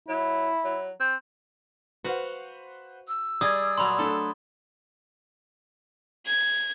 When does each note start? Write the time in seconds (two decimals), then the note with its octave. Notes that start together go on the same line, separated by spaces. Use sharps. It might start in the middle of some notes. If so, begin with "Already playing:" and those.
0.09 F#3 E4
0.64 F#3
1.00 C4
2.04 F#4 B4 C5 F5 F#5
3.08 E6
3.41 G3 G#4 D5 D#5 D6 D#6 G#6
3.78 A#2 F#3 B5 C6
3.99 A3 D4 A4
6.27 G#6